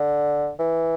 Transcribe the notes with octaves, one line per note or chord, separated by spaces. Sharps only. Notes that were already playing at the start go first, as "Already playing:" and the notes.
Already playing: D3
E3